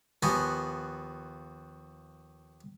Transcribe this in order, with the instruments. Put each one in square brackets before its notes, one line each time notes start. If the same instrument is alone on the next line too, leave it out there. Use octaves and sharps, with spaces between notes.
[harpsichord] D#2 F3 B3 F#4 G#5